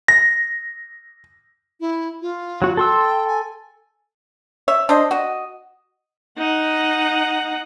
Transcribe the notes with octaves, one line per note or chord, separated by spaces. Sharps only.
A#6
E4
F4
F#3 F#4
A4 G5 C6 E6
G#5
C#5 E5
D4 C5 D#5
F#4 D#5
D#4 F#5